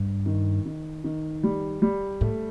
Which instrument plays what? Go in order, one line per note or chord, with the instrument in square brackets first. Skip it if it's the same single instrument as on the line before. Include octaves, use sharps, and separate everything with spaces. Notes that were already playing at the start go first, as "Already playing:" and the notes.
Already playing: [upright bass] G2
[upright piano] D#3
D#3
D#3
G3
G3
[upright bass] A2 [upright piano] A3